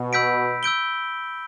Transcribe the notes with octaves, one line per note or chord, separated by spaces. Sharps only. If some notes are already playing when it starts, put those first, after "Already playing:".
Already playing: B2
B5 E6 G6 B6 D7
E6 G6 D7 G7